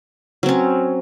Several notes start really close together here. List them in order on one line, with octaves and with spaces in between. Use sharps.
F#3 C4 C#4